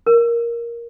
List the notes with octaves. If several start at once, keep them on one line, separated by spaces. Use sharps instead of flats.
A#4